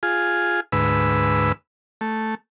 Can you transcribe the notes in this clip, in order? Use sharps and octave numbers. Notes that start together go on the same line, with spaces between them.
F4 G#4
D2 G#2 B4 E6
A3